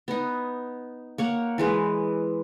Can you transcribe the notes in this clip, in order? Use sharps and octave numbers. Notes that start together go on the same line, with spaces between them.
B3 D#4
A#3 C#5 F#5
E3 G#3 B4